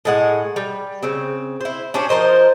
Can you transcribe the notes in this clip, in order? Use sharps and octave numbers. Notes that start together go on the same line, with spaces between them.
A2 G#3 F#5
G3
C#3 C4
E4 C5
C#4 D4 G4 C5
F3 A#4 C5 D#5